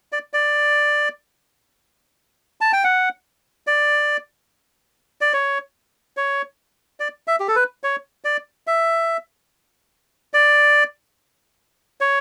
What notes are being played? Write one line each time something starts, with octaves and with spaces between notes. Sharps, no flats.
D5
D5
A5
G5
F#5
D5
D5
C#5
C#5
D5
E5
G4
A4
B4
C#5
D5
E5
D5
C#5